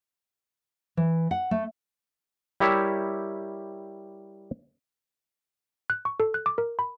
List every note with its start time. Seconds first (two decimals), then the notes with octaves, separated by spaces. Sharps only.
0.97 E3
1.31 F#5
1.51 A3
2.60 G3 E4 G4 A#4 C#5 E5
5.90 F#6
6.05 C#6
6.20 A4
6.34 F#6
6.46 D6
6.58 A#4
6.79 B5